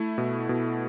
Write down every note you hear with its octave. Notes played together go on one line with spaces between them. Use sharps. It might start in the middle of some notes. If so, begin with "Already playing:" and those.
Already playing: A3 E4
B2
B2